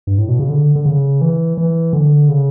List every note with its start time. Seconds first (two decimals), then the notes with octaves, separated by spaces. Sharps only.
0.07 G2
0.18 A2
0.29 B2
0.39 C#3
0.50 D3
0.76 D3
0.86 C#3
1.21 E3
1.57 E3
1.93 D3
2.29 C#3